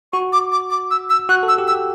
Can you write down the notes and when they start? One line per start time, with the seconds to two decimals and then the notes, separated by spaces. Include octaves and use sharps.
0.13 F#4 C#6
0.33 D6
0.52 D6
0.70 D6
0.91 E6
1.10 E6
1.29 F#4 F#6
1.43 A4
1.48 E6
1.58 G4
1.67 E6
1.72 G4